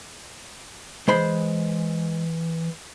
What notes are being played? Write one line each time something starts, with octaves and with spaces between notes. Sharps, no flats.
E3 G#3 C5 B5